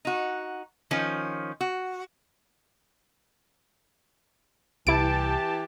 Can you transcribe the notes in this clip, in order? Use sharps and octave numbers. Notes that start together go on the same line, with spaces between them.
D#4 F#4
D#3 F3 C#4
F#4
C2 E3 E4 G4 A5 D7